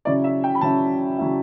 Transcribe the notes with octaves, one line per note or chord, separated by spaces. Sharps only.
C#3 F#3 C#4 E4 D5
E5
G5
B5
C#3 F#3 C#4 E4 A5
C#3 F#3 C#4 E4